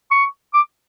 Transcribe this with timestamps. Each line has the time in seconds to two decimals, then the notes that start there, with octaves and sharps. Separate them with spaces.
0.11 C#6
0.54 D6